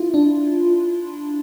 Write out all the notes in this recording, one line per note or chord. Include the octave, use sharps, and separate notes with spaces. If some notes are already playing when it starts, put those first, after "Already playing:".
Already playing: E4 F4
D4